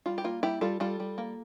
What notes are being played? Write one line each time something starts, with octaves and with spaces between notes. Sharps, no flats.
G3 F4
G4
A#3 F4
G3 E4 G4
G3 F4 A4
G3 F4 A4
G3
A#3